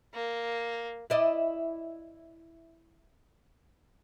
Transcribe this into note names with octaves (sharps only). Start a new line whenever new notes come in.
A#3
E4 D5 D#5